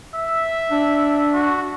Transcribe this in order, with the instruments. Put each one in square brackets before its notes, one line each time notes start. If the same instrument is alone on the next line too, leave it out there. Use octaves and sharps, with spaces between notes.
[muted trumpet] E5
[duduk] D4
[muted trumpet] F#4